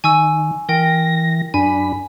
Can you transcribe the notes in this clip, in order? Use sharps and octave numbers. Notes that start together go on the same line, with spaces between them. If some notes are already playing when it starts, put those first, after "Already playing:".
D#3 G#5 C#6 E6
E3 A#4 G5 A#6
F#2 D4 G#5 B5